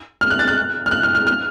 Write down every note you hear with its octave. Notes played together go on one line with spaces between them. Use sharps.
F6
F#6
A6
F#6
F6
F#6
F6
F6
F6